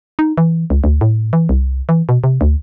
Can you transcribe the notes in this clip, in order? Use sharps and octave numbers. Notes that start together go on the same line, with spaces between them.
D#4
E3
C#2
D2
A2
E3
C2
E3
B2
C3
D2